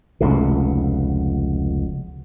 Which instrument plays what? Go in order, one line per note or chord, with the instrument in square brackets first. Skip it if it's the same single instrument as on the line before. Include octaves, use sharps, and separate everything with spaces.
[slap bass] F1 C#2 B2